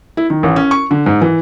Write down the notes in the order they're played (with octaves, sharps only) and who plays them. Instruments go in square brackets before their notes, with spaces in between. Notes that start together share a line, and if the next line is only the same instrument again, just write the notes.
[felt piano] E4
D#3
A1
C#4
C#6
D3
G#2
E3